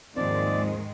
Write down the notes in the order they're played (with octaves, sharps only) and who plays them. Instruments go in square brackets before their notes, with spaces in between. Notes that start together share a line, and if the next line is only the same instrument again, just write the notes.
[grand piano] D#2 F3 C4 [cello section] G#2 D#3 G#3 [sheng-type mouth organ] D5